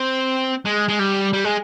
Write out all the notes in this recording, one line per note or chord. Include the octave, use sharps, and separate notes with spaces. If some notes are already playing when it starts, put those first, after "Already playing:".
Already playing: C4
G#3
G#3
G3
G3
G#3